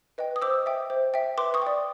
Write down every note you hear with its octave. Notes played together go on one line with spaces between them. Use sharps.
B4 D#5 G5
D#6
C5 D6 E6
E5 G5
C5
E5 G5
B4 C6 D6
C#6 D#6
D5 G5